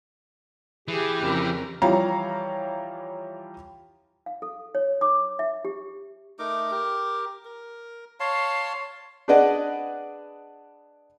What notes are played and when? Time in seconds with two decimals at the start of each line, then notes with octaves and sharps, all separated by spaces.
0.88 E3 G4 G#4
1.20 F2 C#3 A#4
1.82 E3 F3 G3 C#5 F5 A#5
4.26 F5
4.42 A4
4.75 C#5
5.01 D6
5.39 E5
5.65 G4
6.39 A3 D#4 A#4 D6
6.71 G4 A#4
7.45 A#4
8.20 C#5 F5 A5 C6
9.28 D4 G#4 B4 D5 D#5 F#5